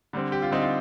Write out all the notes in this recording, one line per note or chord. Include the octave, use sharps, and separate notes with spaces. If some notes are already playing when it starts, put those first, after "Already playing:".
D3 G3 C4
G4
F4
D3 G3 C4 D#4
F4